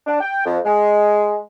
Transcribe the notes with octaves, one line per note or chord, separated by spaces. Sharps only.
D4
G5
F2
G#3